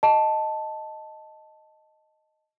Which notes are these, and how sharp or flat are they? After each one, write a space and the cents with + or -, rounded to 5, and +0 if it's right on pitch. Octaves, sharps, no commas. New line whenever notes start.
D#5 +0 A5 +0